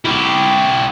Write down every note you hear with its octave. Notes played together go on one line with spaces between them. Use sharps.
E4 G4